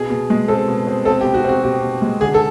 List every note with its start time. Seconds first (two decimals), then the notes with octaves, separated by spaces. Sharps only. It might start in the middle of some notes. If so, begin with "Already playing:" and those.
Already playing: B2 G#4
0.10 B2
0.30 G#3
0.48 C4 A4
0.68 B2
0.87 C4
1.05 C4 A4
1.21 G4
1.25 B2
1.34 F#4
1.44 C4 F#4
1.63 B2 G4
1.82 B2
2.02 G#3
2.21 D3 G#4
2.34 A4